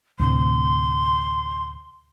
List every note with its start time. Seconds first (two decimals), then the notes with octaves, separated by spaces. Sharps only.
0.20 D2 A2 C3 C6